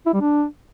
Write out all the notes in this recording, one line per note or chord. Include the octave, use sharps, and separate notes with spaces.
E4
G3
D4